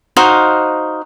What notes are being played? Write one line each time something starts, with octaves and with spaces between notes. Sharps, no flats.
D#4 F#4 C5 F5